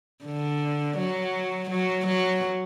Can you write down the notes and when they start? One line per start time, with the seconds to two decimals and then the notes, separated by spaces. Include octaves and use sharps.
0.25 D3
0.98 F#3
1.70 F#3
2.07 F#3